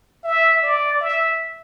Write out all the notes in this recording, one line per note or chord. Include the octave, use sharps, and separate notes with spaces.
E5
D5
E5